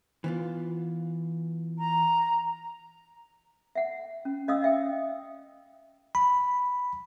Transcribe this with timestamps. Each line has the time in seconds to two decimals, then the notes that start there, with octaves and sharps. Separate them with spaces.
0.24 E3 B3 F4
1.78 A#5
3.75 E5 F#5
4.25 C#4
4.48 C#4 D#5 F5 D#6 E6
4.63 D#5 E5 G5
6.15 B5